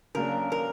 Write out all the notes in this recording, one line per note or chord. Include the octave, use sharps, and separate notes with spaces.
C#3 F#3 A#3 D4 A#4
A#4